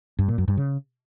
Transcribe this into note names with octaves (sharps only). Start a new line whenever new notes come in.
G2
A#2
F#2
G2
C#3